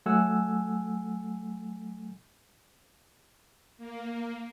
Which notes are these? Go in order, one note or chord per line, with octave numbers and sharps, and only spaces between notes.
F#3 A3 A4 F#5 G#5 E6
A#3